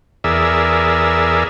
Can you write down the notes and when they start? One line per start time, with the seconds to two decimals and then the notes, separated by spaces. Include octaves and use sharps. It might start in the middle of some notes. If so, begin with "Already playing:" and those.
0.24 E2 G#4 A#4 D5 E5 E6